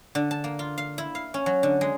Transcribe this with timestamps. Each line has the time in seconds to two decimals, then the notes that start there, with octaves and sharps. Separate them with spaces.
0.15 D3
0.31 A5
0.44 A#3
0.59 F4
0.78 F5
0.98 E4
1.15 F5
1.34 C#4
1.46 F#3
1.63 D3
1.81 G#3